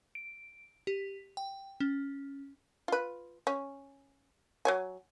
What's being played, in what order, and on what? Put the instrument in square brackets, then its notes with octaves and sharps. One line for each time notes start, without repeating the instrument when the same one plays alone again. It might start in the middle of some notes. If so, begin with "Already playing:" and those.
[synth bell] D7
G4
G5
C#4
[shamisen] F4 B4
C#4
F#3 C#5 G#5